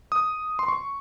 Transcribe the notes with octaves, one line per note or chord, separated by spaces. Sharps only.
D#6
C6
C#6